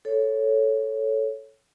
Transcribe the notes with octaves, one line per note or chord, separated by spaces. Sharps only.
A4 C#5